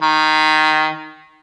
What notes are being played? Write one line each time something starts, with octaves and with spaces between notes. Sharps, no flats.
D#3